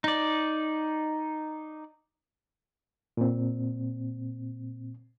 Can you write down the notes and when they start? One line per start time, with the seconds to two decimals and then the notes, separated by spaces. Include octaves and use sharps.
0.04 D#4 D5
3.17 A#2 C4